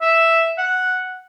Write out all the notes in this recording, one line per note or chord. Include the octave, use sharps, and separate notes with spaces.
E5
F#5